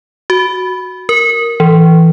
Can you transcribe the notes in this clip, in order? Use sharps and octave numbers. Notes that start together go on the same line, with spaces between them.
F#4
A#4
E3